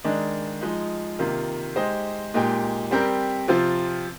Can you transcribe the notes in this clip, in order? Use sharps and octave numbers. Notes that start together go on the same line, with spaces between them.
D#3 G#3 D4
F3 G#3 D#4
C3 D#3 A#3 F4
G#3 D#4 G4 C5 D#5
A#2 G#3 D#4 G4
G3 C4 G4 A#4
C3 F3 C4 F4 C5